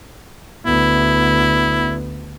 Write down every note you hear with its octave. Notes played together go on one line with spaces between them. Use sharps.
D2 B3 E4